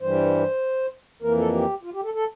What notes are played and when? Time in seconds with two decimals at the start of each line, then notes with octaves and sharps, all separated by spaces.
0.01 G2 E3 G3 C5
1.22 F2 E3 A#3 A#4
1.38 A4
1.53 G4
1.83 F4
1.94 G4
2.03 A4
2.14 A4